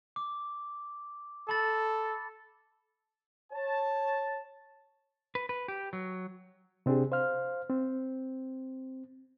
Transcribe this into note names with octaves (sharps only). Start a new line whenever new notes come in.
D6
A4 A5 B5 A6
C#5 A5
B4
B4
G4
F#3
C3 C4 D4 G4 G#4
C5 F5 F6
C4